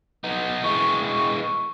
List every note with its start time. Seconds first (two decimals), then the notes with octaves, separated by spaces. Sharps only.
0.24 B3 D#4
0.63 E3 G#3 C#6